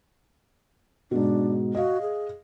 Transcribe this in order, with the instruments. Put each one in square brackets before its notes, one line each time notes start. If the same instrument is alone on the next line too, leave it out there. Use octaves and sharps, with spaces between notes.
[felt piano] G#2 B2 [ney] D4
[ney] F#4 [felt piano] D#5 F5
[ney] G#4